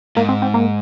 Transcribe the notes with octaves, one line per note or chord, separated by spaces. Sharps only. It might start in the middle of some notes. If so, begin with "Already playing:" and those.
G#2 A#3
C4
C4
A#3